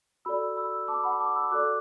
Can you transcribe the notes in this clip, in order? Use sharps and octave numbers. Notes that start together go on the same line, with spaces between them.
F#4 A4 D5 B5 E6
B5 E6
A5 D6
F#5 B5
A5 D6
B5 E6
F#4 A4 D5 D6 F#6